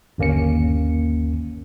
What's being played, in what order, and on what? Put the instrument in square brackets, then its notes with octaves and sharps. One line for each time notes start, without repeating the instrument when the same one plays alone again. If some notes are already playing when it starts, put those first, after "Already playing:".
[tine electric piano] G1 D#2 A#3 C#4 C#7